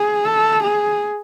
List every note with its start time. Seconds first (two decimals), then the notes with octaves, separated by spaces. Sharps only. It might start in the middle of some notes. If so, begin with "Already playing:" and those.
Already playing: G#4
0.25 A4
0.63 G#4